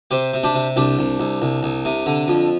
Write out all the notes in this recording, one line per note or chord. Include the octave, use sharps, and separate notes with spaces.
C3 G4 C5
C3
D4 G4
C3
C2 D4 G4
C2
C2
C2
C2
C3
D3
F2